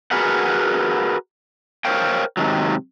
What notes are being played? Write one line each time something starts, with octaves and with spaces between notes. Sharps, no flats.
F#4 G#4 A#4 B4 F#5
A#4 C5 C#5 F5 G5
G#2 C3 D#3 F#3